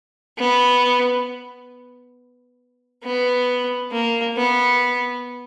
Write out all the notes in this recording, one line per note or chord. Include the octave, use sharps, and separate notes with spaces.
B3
B3
A#3
B3